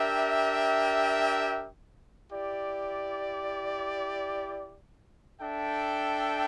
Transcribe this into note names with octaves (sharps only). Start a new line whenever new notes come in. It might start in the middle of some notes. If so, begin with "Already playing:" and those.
Already playing: D4 G4 A#4 E5 G5
E4 G4 D5
D4 A4 E5 G5